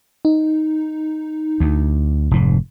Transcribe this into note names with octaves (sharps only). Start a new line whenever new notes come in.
D#4
D2
F1 G#2